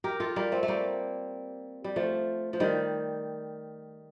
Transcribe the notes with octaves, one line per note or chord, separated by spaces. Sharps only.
G4 A#4
F4 A4
G3 A#3
A3 C4
A3
G3 A#3
G3
F3 A3
F3
D#3 G3